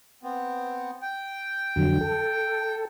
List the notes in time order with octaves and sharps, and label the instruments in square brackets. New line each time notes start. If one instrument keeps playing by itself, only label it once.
[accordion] B3 C4
G5
[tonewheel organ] F2 D3 F#3
A4